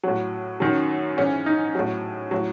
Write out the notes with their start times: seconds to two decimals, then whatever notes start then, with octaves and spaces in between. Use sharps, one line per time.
0.03 A2 F#3
0.60 F#2 D#3 F#3
1.17 G#2 E3 C#4
1.46 D#4
1.75 A2 F#3
2.31 A2 F#3